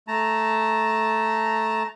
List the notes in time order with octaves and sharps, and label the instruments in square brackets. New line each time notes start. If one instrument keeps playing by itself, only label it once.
[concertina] A3 A5 A#5